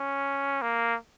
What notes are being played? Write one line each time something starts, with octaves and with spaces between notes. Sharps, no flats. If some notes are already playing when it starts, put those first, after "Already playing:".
Already playing: C#4
A#3